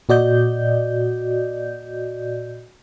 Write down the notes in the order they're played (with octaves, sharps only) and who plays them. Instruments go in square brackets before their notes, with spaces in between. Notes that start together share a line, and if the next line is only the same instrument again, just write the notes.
[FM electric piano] A#2 F#4 D5 D#5 G6